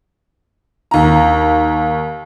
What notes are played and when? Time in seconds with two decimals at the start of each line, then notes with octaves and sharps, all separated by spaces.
0.91 D#2 A#5